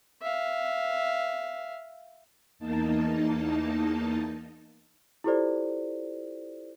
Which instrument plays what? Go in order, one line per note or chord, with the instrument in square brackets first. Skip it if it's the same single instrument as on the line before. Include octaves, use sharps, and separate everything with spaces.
[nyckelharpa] E5 F5
[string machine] E2 A#3 D#4 A5
[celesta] E4 F4 G4 A4 C5 D5